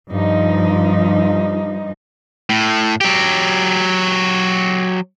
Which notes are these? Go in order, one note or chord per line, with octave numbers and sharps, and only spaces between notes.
G2 F3 D#4
A2
F#3 G4